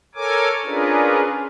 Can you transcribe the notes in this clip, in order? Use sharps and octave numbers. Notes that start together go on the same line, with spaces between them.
A4 A#4 C#5 G#5 D6
C#4 D4 F4 G#4 A#4 B4